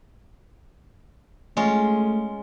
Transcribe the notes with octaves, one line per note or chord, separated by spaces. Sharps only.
G#3 A3 C#4 F4